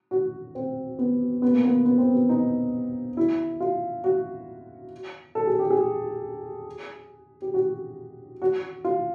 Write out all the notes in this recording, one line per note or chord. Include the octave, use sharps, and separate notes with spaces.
F#4
C4
B3
B3
A#3
B3
B3
C4
B3
D#4
E4
F4
F#4
A4
G#4
G4
G#4
G4
F#4
F#4
F4